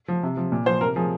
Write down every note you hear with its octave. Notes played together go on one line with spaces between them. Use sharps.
F3
C3
F3
A#2
F3 C5
C3 A#4
F3 G#4